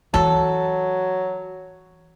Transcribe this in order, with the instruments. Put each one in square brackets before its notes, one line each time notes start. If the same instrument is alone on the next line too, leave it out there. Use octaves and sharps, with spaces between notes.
[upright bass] E3 F4 [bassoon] F#3 [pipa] A4